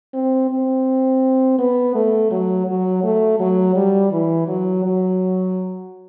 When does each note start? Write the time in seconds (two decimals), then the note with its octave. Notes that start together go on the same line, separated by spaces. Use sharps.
0.14 C4
0.50 C4
1.59 B3
1.95 A3
2.31 F#3
2.67 F#3
3.03 A3
3.40 F#3
3.76 G3
4.11 E3
4.48 F#3
4.84 F#3